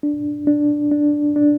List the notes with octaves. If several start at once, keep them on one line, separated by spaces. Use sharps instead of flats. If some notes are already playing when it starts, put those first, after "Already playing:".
D4
D4
D4
D4